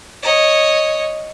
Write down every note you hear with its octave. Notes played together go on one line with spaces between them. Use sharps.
C#5 D#5